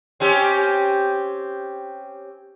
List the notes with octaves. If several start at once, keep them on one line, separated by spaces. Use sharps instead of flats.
C4 C#4 G4